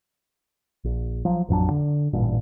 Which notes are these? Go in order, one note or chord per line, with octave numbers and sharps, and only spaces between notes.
A#1
F3 F#3
A1 F2 F#3 D4
D3
A1 G2 A#2